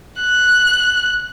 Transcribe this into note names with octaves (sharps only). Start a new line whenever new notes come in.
F#6